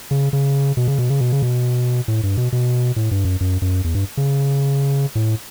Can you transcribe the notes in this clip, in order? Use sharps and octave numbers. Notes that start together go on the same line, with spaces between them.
C#3
C#3
B2
C#3
B2
C#3
B2
C#3
B2
A2
G2
B2
B2
A2
G2
F#2
F#2
F#2
E2
G2
C#3
A2